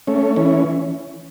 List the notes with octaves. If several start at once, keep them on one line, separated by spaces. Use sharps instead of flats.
A3 C#4
E3 C#4